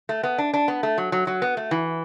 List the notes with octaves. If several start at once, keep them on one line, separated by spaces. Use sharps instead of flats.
A3
B3
D4
D4
B3
A3
F#3
F#3
F#3
B3
A3
E3